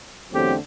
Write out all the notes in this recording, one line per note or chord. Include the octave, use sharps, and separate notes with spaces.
E2 D3 F#3 A3 C4 G4